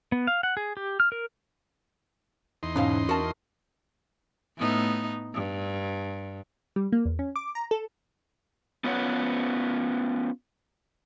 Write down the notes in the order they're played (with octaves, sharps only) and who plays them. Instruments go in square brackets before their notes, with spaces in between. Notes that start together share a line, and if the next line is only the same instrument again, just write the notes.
[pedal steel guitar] B3
F5
F#5
G#4
G4
F6
A#4
[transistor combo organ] E2 D#4 C6
[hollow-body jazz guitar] D2 B2 F5 [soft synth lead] G#2 [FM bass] C#4
[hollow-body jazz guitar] F#4 A5 [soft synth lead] A#4
[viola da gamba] A2 B3 D#4
G2
[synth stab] G3
A#3
E2
C#4
D6
A#5
A4
[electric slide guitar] B3 C#4 F4 B4 C#5 F#5